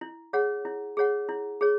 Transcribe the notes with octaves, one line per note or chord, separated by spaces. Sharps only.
E4
G#4 C#5 F#5
E4
G#4 C#5 F#5
E4
G#4 C#5